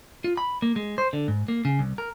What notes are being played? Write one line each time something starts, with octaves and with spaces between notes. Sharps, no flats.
F4
B5
A#3
G#3
C5
D3
G#2
A#3
C#3
C2
A#4